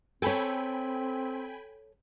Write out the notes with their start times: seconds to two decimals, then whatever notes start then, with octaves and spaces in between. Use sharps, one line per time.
0.22 C4 A4 C#5 G5 G#5 B5